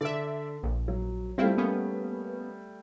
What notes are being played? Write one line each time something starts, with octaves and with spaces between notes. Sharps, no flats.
D3 D5 E5
A#1
F#3
G3 A3 C4 E4 F4
A#3 B3 C#4